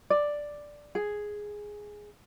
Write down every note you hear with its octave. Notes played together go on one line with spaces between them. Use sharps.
D5
G#4